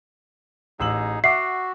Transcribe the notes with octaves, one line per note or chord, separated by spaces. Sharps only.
A1 D#4 G#4 E6 F#7
F#4 E5 F#5 D6 C7